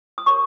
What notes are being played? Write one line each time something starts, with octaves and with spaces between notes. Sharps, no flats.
D#6
G4 A#4 C#5 C#6